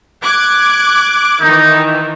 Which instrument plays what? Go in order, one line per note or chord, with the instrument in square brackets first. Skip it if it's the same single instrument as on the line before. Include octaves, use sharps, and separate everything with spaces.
[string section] D6 F#6 G#6
[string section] D#3 E3 [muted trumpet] D#4